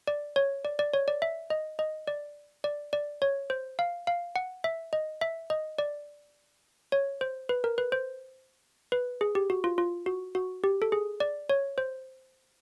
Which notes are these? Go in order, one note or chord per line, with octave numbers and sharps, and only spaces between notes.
D5
C#5
D5
D5
C#5
D5
E5
D#5
D#5
D5
D5
D5
C#5
C5
F5
F5
F#5
E5
D#5
E5
D#5
D5
C#5
C5
B4
A#4
B4
C5
B4
G#4
G4
F#4
F4
F4
F#4
F#4
G4
A4
G#4
D5
C#5
C5